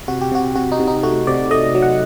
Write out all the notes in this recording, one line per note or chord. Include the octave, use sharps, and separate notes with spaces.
C3 F#4
G4
C3 F#4
C3 F#4
D#4
C3
D#4
A3 F#4
C3 D5
A3 D#5
F#3
F#5